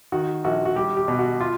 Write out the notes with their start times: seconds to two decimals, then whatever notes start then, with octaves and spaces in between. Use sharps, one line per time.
0.12 D#3 F#4
0.44 A#1 F#4
0.65 F#4
0.76 G3 G4
0.97 G4
1.08 B2
1.19 F#4
1.41 F4